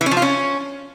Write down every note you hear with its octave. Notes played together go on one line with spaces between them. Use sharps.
E3
C#4
F3
F4
C#4